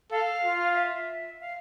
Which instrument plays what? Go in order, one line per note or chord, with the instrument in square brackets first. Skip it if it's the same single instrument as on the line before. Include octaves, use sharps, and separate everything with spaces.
[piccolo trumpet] A4 [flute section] F5
[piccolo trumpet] F4
[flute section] E5
F5